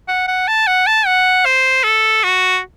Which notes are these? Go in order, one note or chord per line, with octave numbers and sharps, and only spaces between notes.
F#5
F#5
A5
F#5
A5
F#5
C5
A4
F#4